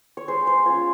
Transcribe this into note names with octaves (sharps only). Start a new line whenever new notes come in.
C#5
G#3 C5
C5
C#4 F4 C#5